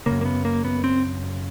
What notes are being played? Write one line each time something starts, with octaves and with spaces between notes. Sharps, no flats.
F#2 C#3 A#3
A#3
B3
A#3
B3
C4